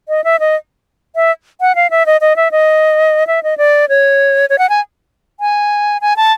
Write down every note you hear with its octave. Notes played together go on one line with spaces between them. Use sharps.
D#5
E5
D#5
E5
F#5
F5
E5
D#5
D#5
E5
D#5
E5
D#5
D5
C#5
C#5
F#5
G#5
G#5
G#5
A5